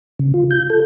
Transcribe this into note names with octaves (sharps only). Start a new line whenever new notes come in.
C#3
F4
G6
A4